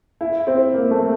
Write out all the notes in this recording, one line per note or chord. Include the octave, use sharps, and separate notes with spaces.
E4
C4
A#3
A3